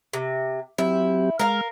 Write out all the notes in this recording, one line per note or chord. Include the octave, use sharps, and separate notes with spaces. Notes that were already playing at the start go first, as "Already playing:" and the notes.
C3
F#3 C4 E4 G4
G#3 A#4 F5 F6